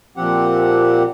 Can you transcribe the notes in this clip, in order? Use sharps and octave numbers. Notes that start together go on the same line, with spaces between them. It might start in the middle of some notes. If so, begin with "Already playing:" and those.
A#2 F3 C4 G4 F#5